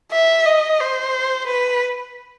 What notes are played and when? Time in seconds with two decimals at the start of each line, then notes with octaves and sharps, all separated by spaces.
0.12 E5
0.46 D#5
0.80 C5
1.47 B4